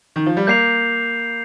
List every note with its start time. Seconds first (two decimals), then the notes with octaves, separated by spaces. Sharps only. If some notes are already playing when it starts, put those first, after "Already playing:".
0.16 D#3
0.26 F3
0.37 G3
0.47 A#3 G6 C7 F7